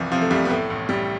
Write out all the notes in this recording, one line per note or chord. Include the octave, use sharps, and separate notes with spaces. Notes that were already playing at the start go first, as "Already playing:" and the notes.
Already playing: C2 E3 F3
C3 F3
A3
C2 G3
B3
A2 A3
A1
A1 G3